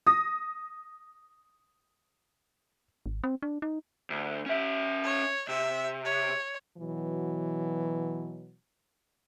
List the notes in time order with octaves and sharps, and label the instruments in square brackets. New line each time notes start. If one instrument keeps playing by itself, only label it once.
[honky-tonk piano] D#6 A#6
[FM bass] G#1
C4
D4
D#4
[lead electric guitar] D2
C#4 E5
[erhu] C#5
[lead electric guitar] C3 [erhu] E5
[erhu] C#5
[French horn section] B2 E3 F#3